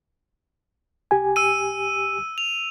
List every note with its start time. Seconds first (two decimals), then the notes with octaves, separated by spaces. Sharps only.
1.11 C2 G4 G#5
1.36 E6 D#7
2.38 F7